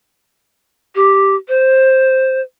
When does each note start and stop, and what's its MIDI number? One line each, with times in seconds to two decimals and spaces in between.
0.95 1.36 67
1.48 2.41 72